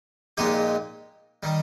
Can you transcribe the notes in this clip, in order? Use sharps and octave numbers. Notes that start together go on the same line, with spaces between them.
A#1 A#2 G#3 D#4 G4
D#3 G3